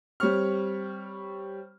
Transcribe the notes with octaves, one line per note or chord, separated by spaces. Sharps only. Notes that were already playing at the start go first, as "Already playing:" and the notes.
G3 C4 C#5 C#6 F6